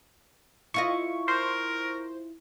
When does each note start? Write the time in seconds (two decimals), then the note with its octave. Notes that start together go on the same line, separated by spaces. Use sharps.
0.74 E4 F4 D#5 C#6
1.28 A#4 C5